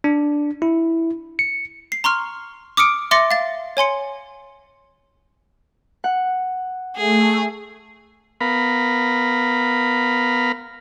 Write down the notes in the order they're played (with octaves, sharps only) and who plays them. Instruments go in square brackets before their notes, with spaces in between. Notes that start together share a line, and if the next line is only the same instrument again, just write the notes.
[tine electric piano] D4
E4
C#7
[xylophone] C7
A#5 C6 C#6 F6
D6 D#6 F6 C#7 D7
E5 C6 D6 A6 A#6 C#7
F5 A6
C#5 G#5 C6 C#7
[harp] F#5
[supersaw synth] A3 [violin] G#4
[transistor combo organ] B3 A#4 F5 B5